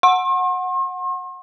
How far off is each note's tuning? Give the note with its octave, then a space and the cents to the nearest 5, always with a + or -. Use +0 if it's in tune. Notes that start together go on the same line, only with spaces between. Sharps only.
F#5 -10 C6 +45